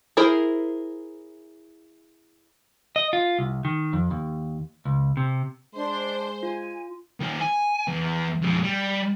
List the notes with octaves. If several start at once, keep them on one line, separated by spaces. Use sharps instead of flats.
E4 G#4 A#4 C5
D#5
F4
C2
D#3
F2
D#2
C#2
C3
G#3 D4 C5 C6
F4 G#5
D#3 F4
G#5
E2
F2 G#3
G3